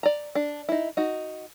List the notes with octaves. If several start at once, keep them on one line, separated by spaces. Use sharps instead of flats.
D5 A#5
D4
D#4 E4
D#4 F#4